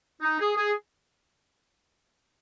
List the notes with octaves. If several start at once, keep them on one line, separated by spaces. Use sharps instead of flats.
D#4
G#4
G#4